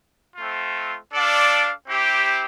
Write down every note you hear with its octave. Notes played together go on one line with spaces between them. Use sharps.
A3 C4 F4
D4 A4 D5 F5
C4 E4 G4